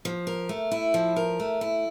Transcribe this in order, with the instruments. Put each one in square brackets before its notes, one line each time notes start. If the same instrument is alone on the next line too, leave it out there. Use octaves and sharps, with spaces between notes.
[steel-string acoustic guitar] F3
A#4
A3
E4
F3
A#4
A3
E4